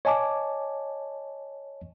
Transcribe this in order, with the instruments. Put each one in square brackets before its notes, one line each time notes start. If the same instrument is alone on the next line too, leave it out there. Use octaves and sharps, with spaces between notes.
[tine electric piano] C#5 D#5 G#5 A5 D6